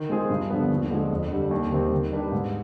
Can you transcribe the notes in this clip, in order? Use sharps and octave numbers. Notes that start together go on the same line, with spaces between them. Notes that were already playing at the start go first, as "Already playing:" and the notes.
Already playing: D#3
G#3 C4 F4 G#4
G2
D3 F3 B3
D#2
D3 F3 G#3
F2
D3 G3
D#2
D#3 G3 C4 G4
D#3
G3 D4 G4 B4
G#2